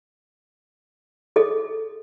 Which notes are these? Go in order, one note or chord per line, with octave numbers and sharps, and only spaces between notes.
G#4 A4 D#5